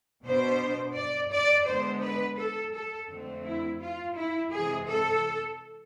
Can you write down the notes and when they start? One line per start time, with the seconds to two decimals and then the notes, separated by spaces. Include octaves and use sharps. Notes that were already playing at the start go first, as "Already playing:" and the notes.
0.24 B2 B3 D4 C5
0.95 D5
1.31 D5
1.67 D3 G#3 B3 D4 C5
2.02 B4
2.38 A4
2.74 A4
3.09 F2 D3 A3 C4
3.46 E4
3.81 F4
4.17 E4
4.53 C3 E3 G#3 G#4
4.89 A4